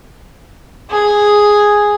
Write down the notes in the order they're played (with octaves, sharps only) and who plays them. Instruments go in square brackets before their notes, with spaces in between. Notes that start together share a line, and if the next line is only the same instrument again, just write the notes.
[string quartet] G#4